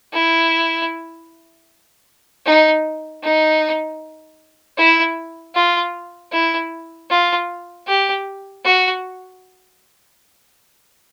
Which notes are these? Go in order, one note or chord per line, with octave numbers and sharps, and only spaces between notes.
E4
D#4
D#4
E4
F4
E4
F4
G4
F#4